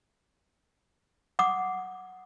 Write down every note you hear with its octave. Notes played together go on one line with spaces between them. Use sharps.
F#5 D6 D#6